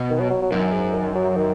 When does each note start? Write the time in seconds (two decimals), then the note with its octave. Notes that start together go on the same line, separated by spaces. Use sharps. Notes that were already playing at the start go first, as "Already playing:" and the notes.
Already playing: B2
0.10 D#3
0.20 F#3
0.30 F#3
0.42 F#3
0.51 F#2 D#3
0.73 G#2
0.94 D#3
1.15 F#3
1.36 D#3